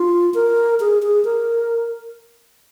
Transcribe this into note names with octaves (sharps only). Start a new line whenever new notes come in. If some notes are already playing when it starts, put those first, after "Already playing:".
Already playing: F4
A#4
G#4
G#4
A#4